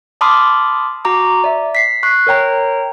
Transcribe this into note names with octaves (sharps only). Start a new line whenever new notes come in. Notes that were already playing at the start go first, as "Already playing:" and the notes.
A5 B5 C6 D6 D#6 F6
F#4 A#5 D6
D5 E5
B6 C7
C#6 F#6 C7
A#4 C#5 G5 A#5